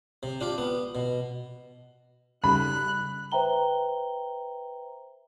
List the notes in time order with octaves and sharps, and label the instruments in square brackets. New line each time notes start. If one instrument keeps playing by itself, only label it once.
[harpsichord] C3
D4 F4 G4
B3
B2
[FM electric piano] C#3 G3 [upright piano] B5 [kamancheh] F#6
[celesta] B4 C5 E5 G5 A#5 G7